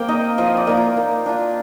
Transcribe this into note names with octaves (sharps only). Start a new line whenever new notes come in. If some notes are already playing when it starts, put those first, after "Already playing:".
Already playing: A#3 C4 F5 G5
D#4 D#5
F3 D#5
D5
A#3 D#4
F4
A#3
D4 F4